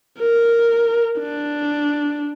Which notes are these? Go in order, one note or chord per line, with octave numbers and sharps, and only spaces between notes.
A#4
D4